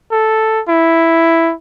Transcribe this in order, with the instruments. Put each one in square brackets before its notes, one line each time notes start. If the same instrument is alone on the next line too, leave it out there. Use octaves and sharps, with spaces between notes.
[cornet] A4
E4